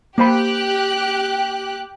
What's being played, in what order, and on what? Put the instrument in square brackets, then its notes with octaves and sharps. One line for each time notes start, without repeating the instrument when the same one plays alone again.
[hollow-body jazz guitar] A#3 C5 B5 [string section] G4 F#6